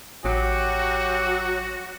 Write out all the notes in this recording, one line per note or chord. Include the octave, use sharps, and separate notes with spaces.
A1 F#3 F#4 G4